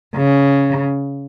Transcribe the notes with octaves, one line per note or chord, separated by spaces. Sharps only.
C#3